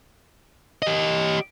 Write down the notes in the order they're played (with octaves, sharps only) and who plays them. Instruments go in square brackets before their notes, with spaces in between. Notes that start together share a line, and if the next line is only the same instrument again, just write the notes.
[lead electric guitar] G4 D#5